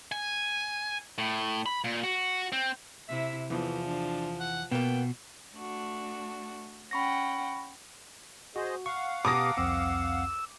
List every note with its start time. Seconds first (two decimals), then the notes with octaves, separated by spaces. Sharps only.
0.12 G#5
1.18 A2
1.66 B5
1.84 A#2
2.04 F#4
2.52 C4
3.09 C3 E4 E5
3.50 E2 E3 F3
3.87 D4
4.40 F#5
4.71 B2 A#3 B3 G5
5.55 A3 D4 F#4
6.91 C#4 F#5 G5 B5 C#6 A#6
8.56 F#4 G#4 C5 D#5
8.86 F5 F#5 C#6
9.25 B2 G4 A5 A#5 D6 D#6 A#6
9.57 C2 F2 C4 E6